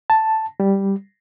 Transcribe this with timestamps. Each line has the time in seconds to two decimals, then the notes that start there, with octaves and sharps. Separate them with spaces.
0.10 A5
0.60 G3